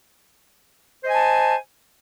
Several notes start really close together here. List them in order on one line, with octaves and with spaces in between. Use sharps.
C5 D#5 G#5 A5